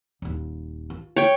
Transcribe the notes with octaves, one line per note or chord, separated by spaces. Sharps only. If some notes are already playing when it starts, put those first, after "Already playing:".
D#1 D#2
F4
C#5 G5